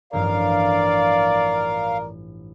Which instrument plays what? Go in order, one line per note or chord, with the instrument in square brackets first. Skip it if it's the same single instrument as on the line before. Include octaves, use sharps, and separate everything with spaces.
[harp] A1 G2 F3 [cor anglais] A#4 [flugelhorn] D5 [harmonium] F5